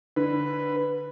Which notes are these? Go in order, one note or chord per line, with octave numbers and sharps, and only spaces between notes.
D3 B4